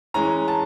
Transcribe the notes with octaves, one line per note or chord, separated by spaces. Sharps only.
E3 G#3 C#4 A#5
A5